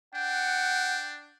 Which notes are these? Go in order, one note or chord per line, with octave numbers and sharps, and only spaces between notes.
D4 F#5 G5